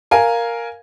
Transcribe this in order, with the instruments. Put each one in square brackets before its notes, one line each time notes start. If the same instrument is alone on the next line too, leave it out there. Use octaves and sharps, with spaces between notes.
[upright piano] A#4 F5 G#5